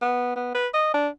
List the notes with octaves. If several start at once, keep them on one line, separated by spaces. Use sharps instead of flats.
B3
B3
B4
D#5
D4